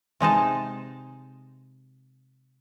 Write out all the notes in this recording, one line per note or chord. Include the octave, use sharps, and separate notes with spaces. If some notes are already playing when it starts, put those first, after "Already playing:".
C3 G#3 D#4 A5